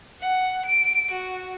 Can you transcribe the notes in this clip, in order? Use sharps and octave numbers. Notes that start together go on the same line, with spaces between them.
F#5
D7
F#4